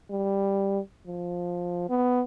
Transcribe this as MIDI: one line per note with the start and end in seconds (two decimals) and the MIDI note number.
0.11 0.80 55
1.07 1.86 53
1.89 2.22 59